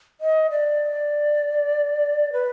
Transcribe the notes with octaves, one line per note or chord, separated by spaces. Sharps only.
D#5
D5
B4